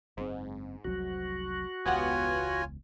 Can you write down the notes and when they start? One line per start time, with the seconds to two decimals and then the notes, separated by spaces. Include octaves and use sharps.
0.17 F#1 G#2 C4
0.84 F1 C2 F#3 F#4
1.86 E1 C#2 B3 F4 G4 C#5 F#5 G#5